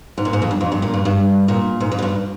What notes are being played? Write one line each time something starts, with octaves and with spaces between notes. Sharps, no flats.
G#2
A#2
G#2
F2
G2
F2
G2
A#2
G2
G2
A#2
G#2
F2
G#2
G2